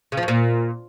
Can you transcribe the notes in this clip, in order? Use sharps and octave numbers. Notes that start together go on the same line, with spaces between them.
C#3
F3
F#2
A#2